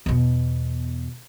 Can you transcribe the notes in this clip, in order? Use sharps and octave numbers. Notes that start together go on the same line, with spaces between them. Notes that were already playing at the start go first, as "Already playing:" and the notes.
E2 B2